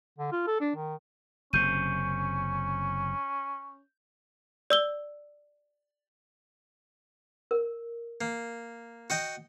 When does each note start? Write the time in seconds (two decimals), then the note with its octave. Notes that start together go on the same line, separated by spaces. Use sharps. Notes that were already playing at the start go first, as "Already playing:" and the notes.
0.19 D3
0.32 F4
0.47 A4
0.60 D4
0.75 D#3
1.53 F#1 C3 C#4 G6 D#7
4.70 D5 E6 G7
7.51 A#4
8.21 A#3
9.10 F#4 D#5 G5